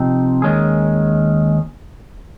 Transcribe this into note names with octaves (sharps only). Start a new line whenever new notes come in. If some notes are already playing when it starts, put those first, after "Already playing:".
Already playing: C3 F3 C4 D#4
D#2 D#3 G#3 C#4 G#4